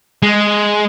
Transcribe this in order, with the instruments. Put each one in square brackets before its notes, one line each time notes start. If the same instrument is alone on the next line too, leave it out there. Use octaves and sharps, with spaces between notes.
[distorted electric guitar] G#3